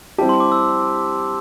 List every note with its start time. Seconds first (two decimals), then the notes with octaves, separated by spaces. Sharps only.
0.18 G3 C4 E4 G4 A5
0.29 C6
0.40 D6
0.52 E6